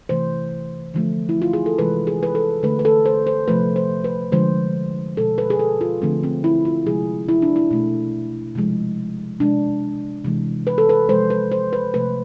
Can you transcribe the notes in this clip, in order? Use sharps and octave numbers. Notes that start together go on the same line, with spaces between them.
C3 E3 A3 C5
D3 F3 A3
E4
F4
G#4
A4
C3 E3 G#3 B4
G#4
B4
A4
D3 A3 B4
B4
A4
C5
C5
C3 F3 A3 B4
C5
B4
D3 F3 G#3 C5
B2 G#3 A4
B4
G#4
A4
F4
D3 F3 A3 C4
C4
E4
F4
C3 F3 G#3 G#4
E4
D4
E4
B2 A3
C3 F3 G#3
C3 G#3 D4
C3 E3 G#3
B4
A4
B4
C3 F3 G#3 C5
B4
C5
B4
C3 F3 A3 B4